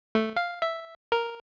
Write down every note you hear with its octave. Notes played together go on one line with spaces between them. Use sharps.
A3
F5
E5
A#4